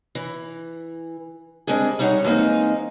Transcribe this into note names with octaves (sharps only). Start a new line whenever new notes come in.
E3
G3 G#3 C4 D4 G#4
G3 B3 D#4 G#4 C#5 F#5
E3 G#3 A#3 C4 D#4